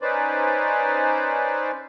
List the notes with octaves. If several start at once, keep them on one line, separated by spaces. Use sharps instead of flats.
C#4 D#4 B4 C5 D5